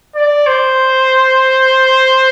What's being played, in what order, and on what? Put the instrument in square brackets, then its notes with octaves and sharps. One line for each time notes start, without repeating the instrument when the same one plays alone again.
[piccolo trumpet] D5
C5